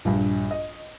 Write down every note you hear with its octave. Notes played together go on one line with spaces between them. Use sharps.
A#1 G2
D#5